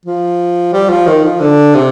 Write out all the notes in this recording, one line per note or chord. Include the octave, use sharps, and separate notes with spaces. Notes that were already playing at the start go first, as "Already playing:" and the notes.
F3
G3
F3
D#3
F3
D3
C3